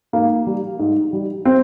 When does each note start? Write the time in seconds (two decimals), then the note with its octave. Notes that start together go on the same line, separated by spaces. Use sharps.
0.13 G#2 A#3
0.47 G3
0.79 G#2
1.13 G3
1.45 C4